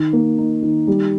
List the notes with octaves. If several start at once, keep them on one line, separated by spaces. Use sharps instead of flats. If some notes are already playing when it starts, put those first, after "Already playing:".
Already playing: D#3
A#3
D#4
D#3
G3